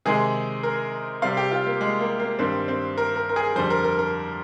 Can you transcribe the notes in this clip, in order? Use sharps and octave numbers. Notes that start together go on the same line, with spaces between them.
C3 D#3 G#3 G#4
A#4
C3 G3 F5
G4
F4
A#3
G#3
A#3
A#3
G2 D#3 G3 C4
C4
A#4
A#4
A#4
G#4
F2 D3 G3 C5
A#4
A#4
A#4